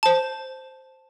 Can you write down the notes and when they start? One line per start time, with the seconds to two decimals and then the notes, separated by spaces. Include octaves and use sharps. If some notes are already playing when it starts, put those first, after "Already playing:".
0.03 C5 A5